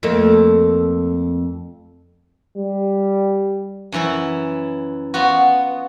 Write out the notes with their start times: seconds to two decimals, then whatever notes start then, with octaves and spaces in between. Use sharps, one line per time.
0.03 F2 A3 A#3
2.57 G3
3.92 F#2 E3 E4
5.14 B3 F4 F#4